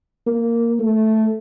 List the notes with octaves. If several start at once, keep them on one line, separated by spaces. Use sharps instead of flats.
A#3
A3